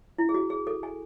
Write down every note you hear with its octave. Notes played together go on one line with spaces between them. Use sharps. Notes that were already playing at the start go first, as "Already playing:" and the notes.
E4
G#4
F#4
G#4
A4
G#5